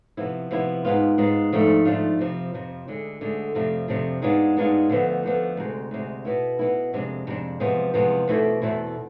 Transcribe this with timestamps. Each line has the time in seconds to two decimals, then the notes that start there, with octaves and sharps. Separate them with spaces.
0.17 C3 F3 B3 E4
0.51 C3 F3 B3 E4
0.85 G#2 G#3 B3 F4
1.18 G#2 G#3 B3 F4
1.52 G#2 F3 A3 D4 F4
1.85 G#2 F3 A3 D4 F4
2.19 F2 C3 F3
2.54 F2 C3 F3
2.88 D2 D3 G#3
3.21 D2 D3 G#3
3.55 F2 C3 F3 A3 D4
3.88 F2 C3 F3 A3 D4
4.22 G#2 G#3 B3 D4 F4
4.57 G#2 G#3 B3 D4 F4
4.90 D2 D3 F3 B3
5.23 D2 D3 F3 B3
5.57 D2 C3 G#3
5.91 D2 C3 G#3
6.25 B2 B3 E4
6.59 B2 B3 E4
6.93 F2 C3 G#3 D4
7.27 F2 C3 G#3 D4
7.60 E2 C3 F3 G#3 B3
7.94 E2 C3 F3 G#3 B3
8.28 E2 B2 A3 C4 E4
8.62 E2 B2 A3 C4 E4